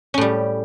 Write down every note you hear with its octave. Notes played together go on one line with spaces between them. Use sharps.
A2 G3 C#4